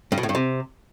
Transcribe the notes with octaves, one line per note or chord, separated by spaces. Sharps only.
G2
B2
A2
G2
C3